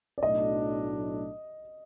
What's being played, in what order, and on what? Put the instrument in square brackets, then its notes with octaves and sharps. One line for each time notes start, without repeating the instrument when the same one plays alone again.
[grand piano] D5
[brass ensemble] B1 A2 F#3 A3 D4 [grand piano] D#5